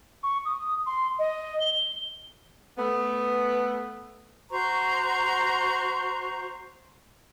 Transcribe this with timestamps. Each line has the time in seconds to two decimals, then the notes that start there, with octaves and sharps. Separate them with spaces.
0.23 C#6
0.45 D#6
0.86 C6
1.19 D#5
1.60 G7
2.78 A3 B3
4.50 F#4 C5 A#5 C#6